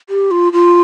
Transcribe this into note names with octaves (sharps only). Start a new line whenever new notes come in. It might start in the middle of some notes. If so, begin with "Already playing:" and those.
G4
F4
F4